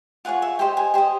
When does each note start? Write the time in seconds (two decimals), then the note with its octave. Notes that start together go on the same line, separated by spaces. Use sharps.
0.25 F4 G#4 C#5 F#5
0.42 E5
0.59 G4 C5 D#5 G5
0.77 G#5
0.94 G4 C5 D#5